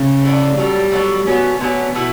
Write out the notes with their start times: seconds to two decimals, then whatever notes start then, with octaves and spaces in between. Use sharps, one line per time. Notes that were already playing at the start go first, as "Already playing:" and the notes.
Already playing: C#3
0.23 E3 B3 D4
0.57 F#3 G3 B3 D4 A4
0.92 F#3 B3 D4 A4
1.27 D3 F#3 B3 C#4
1.61 D3 F#3 B3 C#4
1.95 B2 A3 E4 B4